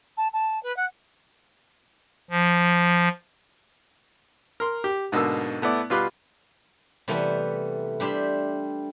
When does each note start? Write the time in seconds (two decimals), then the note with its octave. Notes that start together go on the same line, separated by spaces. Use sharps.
0.17 A5
0.33 A5
0.63 B4
0.77 F#5
2.30 F3
4.60 A#4 C6
4.84 G4
5.12 G#2 B2 D3 A#3 E6
5.62 A3 B3 E4 D5
5.90 B2 G3 F4 B4 D6 F#6
7.08 C3 E3 G3 A3 B3 A4
8.00 G3 D4 G4 C5 E5